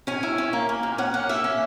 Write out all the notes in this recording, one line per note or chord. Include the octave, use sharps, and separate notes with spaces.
C#4 G#5
E4
C#4
A#3
A#3
A#2
C#4 F#5
A#3 F#5
A#3 E5
C#4